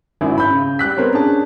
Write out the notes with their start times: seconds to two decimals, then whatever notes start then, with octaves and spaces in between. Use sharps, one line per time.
0.21 G#1 F#2 E4
0.38 B5 G6
0.51 C#3
0.79 G3 G4 F#6 B6
0.97 B3 C4 A#4 C5 C#5
1.13 C#4 D4 G#4 A5